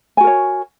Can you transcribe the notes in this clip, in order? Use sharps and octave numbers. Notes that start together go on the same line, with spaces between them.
F#4 A#4 C#5 G#5